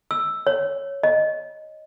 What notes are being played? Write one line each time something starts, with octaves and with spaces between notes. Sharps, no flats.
E6
C#5
D#5